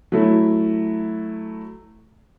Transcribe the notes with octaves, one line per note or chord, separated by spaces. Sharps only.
F#3 A3 E4